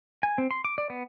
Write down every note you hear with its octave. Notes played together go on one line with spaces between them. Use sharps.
G#5
C4
C6
D6
D5
B3